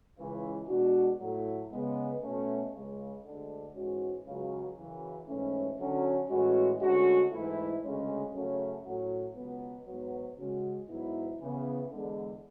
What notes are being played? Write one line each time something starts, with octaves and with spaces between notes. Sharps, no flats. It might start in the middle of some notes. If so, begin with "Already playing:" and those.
C#2 C#3 E3
B2 G#3 D4 F#4
A2 F#3 A3 E4
C#3 G#3 B3
B2 A3 C#4
C#2 C#3 G#3
D2 D3 G#3 D4
G#2 E3 G#3 C#4 F#4
C#2 C#3 F#3
F#2 C#3 E3
G#2 E3 A3 C#4
D3 F#3 C#4
A2 E3 G#3 C#4 F#4
D2 D3 G#3 C#4 F#4
G#2 E3 A3 E4
D2 C#3 G#3 C#4
F#2 C#3 F#3 A3 C#4
A2 F#3 C#4 F#4
C#2 B2 F#3 B3
G#2 F#3 B3
C#3 G#3 C#4 F#4
G#2 F#3 B3 E4
C#3 E3 B3
E2 D3 G#3